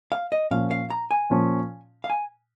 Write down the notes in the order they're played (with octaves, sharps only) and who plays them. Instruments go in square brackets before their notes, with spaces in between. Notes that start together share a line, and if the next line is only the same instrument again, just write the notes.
[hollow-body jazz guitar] F5
D#5
[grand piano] A#2 F3 C#4 [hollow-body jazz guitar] F5
[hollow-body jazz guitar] F5
A#5
G#5
[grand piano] A#2 F3 C#4
[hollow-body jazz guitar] F5
G#5